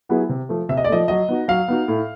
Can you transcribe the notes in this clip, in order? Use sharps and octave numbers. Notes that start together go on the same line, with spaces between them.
F#3 B3 E4 G#4
C3
F3 A3
C3 E5
D#5
D5
F3 A3 D#5
F#3 D#5
B3 D#4 F#4
F#3 F5
B3 D#4 F#4
A2